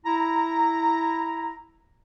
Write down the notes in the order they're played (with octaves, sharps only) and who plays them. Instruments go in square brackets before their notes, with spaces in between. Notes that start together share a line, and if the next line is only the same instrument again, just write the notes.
[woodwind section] E4 A#5